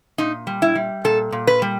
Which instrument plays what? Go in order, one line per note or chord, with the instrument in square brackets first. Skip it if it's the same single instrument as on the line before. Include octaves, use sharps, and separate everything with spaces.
[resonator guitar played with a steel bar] A#2 D#4
G3
E4
G3
A#2 A4
A#2
B4
G3